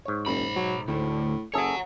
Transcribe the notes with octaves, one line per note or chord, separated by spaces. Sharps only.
G#2 C#5
F#1 B1 B5
F#3
D2 A2
F#1 G#4 A4 C#5 E5 F#5